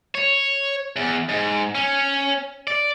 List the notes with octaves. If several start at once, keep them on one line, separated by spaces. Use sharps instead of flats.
C#5
E2
G#2
C#4
D5